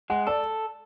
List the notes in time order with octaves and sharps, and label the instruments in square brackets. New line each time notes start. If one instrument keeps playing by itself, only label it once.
[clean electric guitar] G#3 [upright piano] F#5
[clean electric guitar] A4 [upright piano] D5